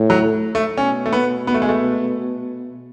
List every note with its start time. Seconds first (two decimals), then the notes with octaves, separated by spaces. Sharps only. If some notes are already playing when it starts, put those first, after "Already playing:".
Already playing: A2
0.10 F#3
0.55 A3
0.77 B2 C#4
1.06 A3
1.13 B3
1.47 B3
1.54 A3
1.62 G#3
1.69 A3